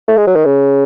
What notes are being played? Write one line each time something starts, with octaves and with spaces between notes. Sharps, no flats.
A3
G#3
F#3
D#3
C#3